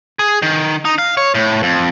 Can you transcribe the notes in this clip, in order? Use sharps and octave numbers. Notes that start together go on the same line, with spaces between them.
G#4
D#3
D#4
F5
C#5
A2
F2